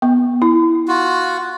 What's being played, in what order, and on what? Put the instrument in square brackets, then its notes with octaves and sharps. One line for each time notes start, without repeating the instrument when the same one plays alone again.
[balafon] B3
E4
[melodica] F4 F#4